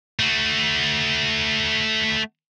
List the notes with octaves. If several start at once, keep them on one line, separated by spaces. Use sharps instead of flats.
A3 F#4